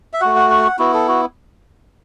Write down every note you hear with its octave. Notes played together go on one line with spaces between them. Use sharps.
E5
A3 F#4 F#5
F#5
F#5
B3 E4 F#4
A4
F#4